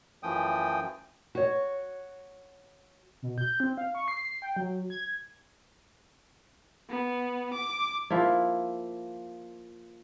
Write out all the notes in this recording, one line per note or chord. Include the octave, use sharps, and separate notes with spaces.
F#2 E3 F3 A3 G5 D#6
F#4 C#5
B2
G6
C4
F5
C#6
C7
G5
F#3
G#6
B3
D6
F3 A#3 E4